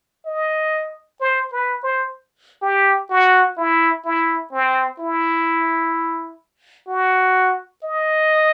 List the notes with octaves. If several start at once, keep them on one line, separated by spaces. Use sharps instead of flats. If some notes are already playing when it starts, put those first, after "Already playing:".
D#5
C5
B4
C5
G4
F#4
E4
E4
C4
E4
F#4
D#5